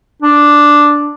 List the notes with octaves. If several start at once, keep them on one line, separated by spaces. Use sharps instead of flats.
D4